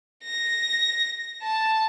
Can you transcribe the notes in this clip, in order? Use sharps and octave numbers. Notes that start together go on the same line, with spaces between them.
A#6
A5